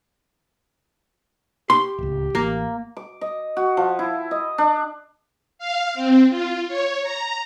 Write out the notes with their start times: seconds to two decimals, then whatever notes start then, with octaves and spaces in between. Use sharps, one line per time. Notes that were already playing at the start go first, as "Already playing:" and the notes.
1.70 G4 C6
1.98 D1 C#2
2.35 A1 A#3
2.97 D6
3.21 D#5
3.57 F#4
3.77 F3
3.99 E4
4.31 D#5
4.58 D4
5.59 F5
5.94 C4
6.29 F4
6.68 C#5
7.03 A#5